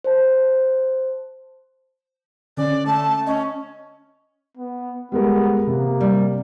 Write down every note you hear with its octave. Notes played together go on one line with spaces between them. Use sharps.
C5 A5
D3 C#4 D5
A3 A5
C#4 D#5
B3
G3 G#3 B3 A#4
C3 A#3
G3